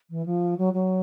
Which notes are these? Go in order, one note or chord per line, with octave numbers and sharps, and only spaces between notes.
E3
F3
F#3
F#3